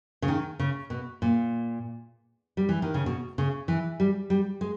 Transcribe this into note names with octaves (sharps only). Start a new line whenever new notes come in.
C#3
D#3
C#3
B2
A#2
G3
E3
D#3
C#3
B2
C#3
E3
G3
G3
G#3